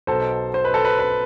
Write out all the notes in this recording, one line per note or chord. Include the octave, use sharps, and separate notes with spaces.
B1 B2 A4 C5
C5
B4
A4
B4
B4